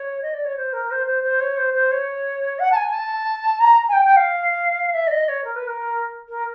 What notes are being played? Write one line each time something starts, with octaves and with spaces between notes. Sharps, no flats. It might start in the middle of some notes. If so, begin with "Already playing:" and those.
Already playing: C#5
D#5
D5
C#5
C5
A#4
C5
C5
C5
C#5
C5
C5
C#5
F#5
A5
G#5
A5
A#5
G#5
G5
G5
F5
E5
D5
D#5
C#5
A#4
B4
A#4
A#4